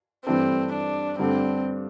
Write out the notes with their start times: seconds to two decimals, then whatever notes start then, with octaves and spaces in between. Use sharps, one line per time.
0.25 G2 E3 A3 C4 D4 A4
0.73 D4
1.19 G2 D3 A3 C4 D4 A4